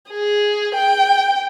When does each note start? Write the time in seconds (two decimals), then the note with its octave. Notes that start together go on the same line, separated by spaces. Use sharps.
0.10 G#4
0.75 G5